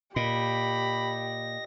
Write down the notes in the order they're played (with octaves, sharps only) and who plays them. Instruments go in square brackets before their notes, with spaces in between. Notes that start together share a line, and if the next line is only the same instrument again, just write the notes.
[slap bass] A#2 [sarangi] G4 [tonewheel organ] D#5 A#6 [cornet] B5